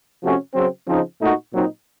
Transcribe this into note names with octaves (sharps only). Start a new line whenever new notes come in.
C3 F3 A3 C#4 F#4
C#3 F#3 C4
C#3 F3 C4 D#4
A#2 A3 D#4 F#4
A#2 F#3 C4 D#4